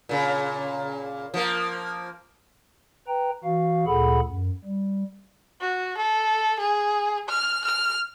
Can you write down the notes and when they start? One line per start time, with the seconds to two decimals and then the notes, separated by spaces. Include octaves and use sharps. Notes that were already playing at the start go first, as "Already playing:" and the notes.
0.09 A#2 C#3
1.34 F3 A#3
3.08 B4 G5 A#5
3.44 E3 F#4 F5
3.86 D2 A#2 G#4 A4 F#5 B5
4.26 F#2
4.65 G3
5.61 F#4
5.98 A4
6.60 G#4
7.29 F6
7.65 F6